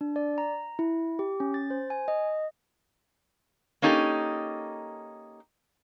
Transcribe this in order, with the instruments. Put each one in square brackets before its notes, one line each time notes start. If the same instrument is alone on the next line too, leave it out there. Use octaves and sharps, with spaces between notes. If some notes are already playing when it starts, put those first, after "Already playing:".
[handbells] D4
D5
A#5
E4
G4
C#4
A6
C5
G#5
D#5
[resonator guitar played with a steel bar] A#3 C#4 D#4 G4 A4